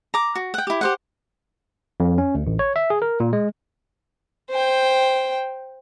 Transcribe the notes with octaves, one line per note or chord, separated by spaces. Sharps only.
A#5 D6
F#4
F#5 G5
E4 G4
G4 C5 F#5
F2
C#4
D2
A1
C#5
E5
G#4
A#4
A#2
G#3
C5 G5